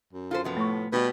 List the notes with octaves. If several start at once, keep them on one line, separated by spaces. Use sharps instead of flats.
F#2
F4 A4 C5
C3 F3 B3
A2 A3 C#6
B2 G3 G4 B4